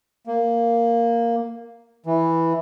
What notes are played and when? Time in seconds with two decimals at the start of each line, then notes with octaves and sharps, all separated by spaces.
0.27 A#3
2.06 E3